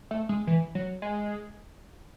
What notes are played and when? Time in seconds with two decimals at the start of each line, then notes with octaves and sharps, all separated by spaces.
0.11 A3
0.29 G#3
0.47 E3
0.75 F#3
1.02 G#3